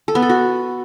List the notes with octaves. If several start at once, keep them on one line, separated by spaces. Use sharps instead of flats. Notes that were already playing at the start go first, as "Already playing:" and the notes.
A4
B3
A4
F#4